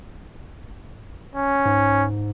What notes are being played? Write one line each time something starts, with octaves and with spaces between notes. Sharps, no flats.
C#4
G#2